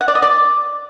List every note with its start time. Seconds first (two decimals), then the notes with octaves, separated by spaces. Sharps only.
0.01 F#5
0.08 D5
0.15 D#5
0.22 D5